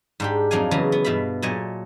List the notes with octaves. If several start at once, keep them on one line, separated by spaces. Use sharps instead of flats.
G#2 D4 G4
F2 F#3 D4 D#4 F5 G#5
C#3 E3 F#3 B3
B3
G2 B2 E5 F5 B5
A#2 F#3 A3 D#5 G#5 A5